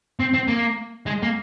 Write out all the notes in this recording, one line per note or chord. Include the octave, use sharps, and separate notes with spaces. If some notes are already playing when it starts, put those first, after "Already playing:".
C4
C4
A#3
G#3
A#3